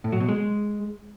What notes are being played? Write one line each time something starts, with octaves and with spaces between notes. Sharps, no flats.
A2
F#3
B2
G#3